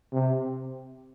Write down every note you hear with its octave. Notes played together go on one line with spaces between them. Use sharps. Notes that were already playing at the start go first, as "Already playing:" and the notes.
C3